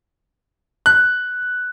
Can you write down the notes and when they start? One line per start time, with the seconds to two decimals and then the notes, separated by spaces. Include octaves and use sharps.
0.86 F#6